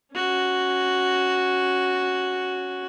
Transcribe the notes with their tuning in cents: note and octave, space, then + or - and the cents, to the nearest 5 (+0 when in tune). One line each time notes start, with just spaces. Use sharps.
C#4 +0 F#4 +0